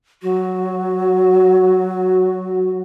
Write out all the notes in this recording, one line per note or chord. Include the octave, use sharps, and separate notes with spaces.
F#3 F#4